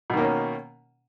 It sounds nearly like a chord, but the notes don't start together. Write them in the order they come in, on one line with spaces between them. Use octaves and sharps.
B2 D#3 A#3 C#4